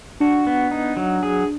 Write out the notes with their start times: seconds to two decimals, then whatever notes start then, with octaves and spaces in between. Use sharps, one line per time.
0.20 D4 F#4
0.47 B3
0.71 D#4
0.97 F#3
1.23 G#4